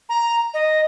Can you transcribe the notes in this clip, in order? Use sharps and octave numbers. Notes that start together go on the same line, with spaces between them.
A#5
D#5